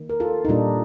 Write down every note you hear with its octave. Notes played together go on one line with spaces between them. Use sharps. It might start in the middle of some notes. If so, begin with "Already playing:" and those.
Already playing: D#3 A#3
A#4
F4 A4
D#4
A#2 G3 A#3 D4 F4